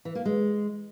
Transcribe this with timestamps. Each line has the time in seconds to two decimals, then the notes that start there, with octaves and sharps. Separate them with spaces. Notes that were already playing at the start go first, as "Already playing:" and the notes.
0.05 E3
0.15 A#3
0.25 G#3